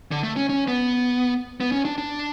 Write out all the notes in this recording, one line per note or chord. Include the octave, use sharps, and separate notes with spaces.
D3
A3
C#4
C#4
B3
B3
C#4
D4
D4